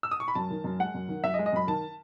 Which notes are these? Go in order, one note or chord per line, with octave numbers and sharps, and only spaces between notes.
E6
D#6
C#6
B5
F#2 A5
D#3
F#2
G#3 F#5
F#2
D#3
F#2 E5
D#5
G#3
D#5
F#2 B5
D#3 A5